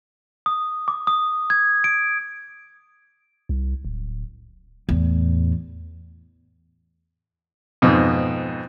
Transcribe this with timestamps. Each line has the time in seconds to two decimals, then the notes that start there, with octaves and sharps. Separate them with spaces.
0.46 D#6
0.88 D6
1.07 D#6
1.50 G#6
1.84 D7
3.49 C2
3.85 D1
4.89 E2 A2
7.82 F2 G#2 B2